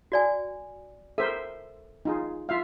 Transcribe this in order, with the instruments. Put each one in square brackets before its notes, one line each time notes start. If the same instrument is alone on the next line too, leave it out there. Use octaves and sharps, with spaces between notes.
[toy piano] F#4 D5 G#5
[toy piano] A4 [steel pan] A#4 C5 E5
[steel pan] D#4 F4 G#4
F4 E5 F5